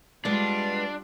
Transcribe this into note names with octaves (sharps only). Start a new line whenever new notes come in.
G3 G#3 B3 D4 F4